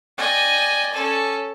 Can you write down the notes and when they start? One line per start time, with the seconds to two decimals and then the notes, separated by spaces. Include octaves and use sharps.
0.18 D5 D#5 G5 G#5
0.93 C#4 A4